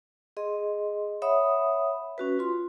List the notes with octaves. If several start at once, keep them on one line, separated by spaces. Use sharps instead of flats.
G#4 D#5 C6
C#5 E5 F#5 B5 D#6
C#4 F#4 B4
F4 C6